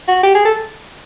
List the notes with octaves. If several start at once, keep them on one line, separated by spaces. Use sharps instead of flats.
F#4
G4
G#4
A4